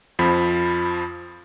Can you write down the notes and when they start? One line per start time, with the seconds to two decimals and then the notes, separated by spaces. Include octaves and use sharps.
0.19 F2 F3 B5